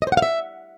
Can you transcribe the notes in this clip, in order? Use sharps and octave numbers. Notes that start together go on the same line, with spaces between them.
D#5
C5
F#5
F5
E5